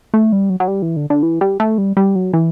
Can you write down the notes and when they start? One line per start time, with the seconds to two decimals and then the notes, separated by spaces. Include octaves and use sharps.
0.14 A3
0.32 G3
0.50 F#3
0.60 F#3
0.68 G3
0.82 E3
0.96 D3
1.10 D3
1.23 E3
1.41 G3
1.60 A3
1.78 G3
1.97 G3
2.15 F#3
2.33 E3